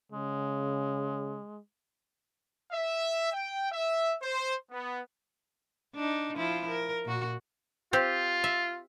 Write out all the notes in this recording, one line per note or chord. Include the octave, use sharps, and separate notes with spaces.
C#3 G#3
E5
G5
E5
C5
B3
D4 D#4
F3 E4 F4
A#4
A#2 F#4
C4 F4 G4
E5